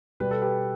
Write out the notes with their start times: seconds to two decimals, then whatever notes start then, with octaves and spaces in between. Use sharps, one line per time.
0.20 B2 G3 B4
0.31 A4
0.42 G4 B4